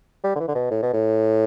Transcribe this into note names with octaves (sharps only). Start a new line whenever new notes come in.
G3
D3
E3
D3
B2
A2
B2
A2